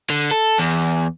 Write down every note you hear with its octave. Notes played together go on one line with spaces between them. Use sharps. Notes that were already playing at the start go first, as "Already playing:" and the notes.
D3
A4
E2